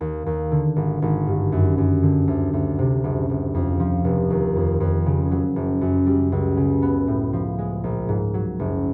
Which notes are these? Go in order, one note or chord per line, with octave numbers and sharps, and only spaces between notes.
D#2
D#2
D3
G#1
G#1
G2
F#2
F#2
D3
D2
D2
C3
F#1
F#1
F2
F3
F1
D#2
F2
F2
C#3
F#3
F#1
F#2
G3
C#2
C#3
B3
A2
F3
G#3
A#1
G#2
F#3
F#1